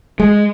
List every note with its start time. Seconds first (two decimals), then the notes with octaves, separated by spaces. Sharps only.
0.20 G#3